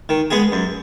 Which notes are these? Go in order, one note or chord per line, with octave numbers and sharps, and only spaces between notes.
D#3
G#3 B3 G#4
F#2